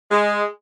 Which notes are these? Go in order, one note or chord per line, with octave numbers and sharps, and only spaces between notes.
G#3